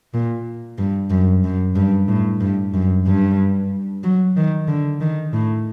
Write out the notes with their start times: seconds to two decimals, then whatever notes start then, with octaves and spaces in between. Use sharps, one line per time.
0.14 A#2
0.78 G2
1.11 F#2
1.44 F#2
1.76 G2
2.08 A2
2.41 G2
2.73 F#2
3.07 G2
4.04 F#3
4.36 D#3
4.68 D3
5.01 D#3
5.33 A2